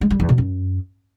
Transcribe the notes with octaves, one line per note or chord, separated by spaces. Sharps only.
G#3
G3
E2
B2
F#2